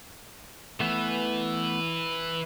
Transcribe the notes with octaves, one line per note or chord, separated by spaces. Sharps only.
E3 A3 B3